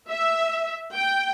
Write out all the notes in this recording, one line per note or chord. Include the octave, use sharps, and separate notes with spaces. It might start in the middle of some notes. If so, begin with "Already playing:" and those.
E5
G5